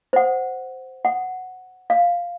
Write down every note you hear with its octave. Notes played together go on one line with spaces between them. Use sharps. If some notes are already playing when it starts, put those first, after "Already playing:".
C5 F#5
F#5
F5